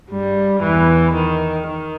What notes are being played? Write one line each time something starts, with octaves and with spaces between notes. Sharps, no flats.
G2 G3
E2 E3
D#3
D#3